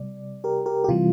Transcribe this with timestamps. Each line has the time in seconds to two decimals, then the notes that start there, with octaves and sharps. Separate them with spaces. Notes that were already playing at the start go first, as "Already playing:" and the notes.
Already playing: C3 G3 D5
0.44 G4 A#4
0.66 G4 A#4
0.84 G4
0.89 C3 E3 G3 F4